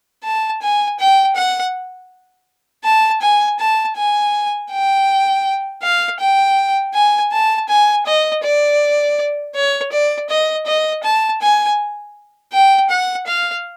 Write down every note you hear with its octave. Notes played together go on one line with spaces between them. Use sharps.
A5
G#5
G5
F#5
A5
G#5
A5
G#5
G5
F5
G5
G#5
A5
G#5
D#5
D5
C#5
D5
D#5
D#5
A5
G#5
G5
F#5
F5